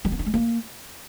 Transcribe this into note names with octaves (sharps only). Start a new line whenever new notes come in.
G3
B3
D4
G#3
A#3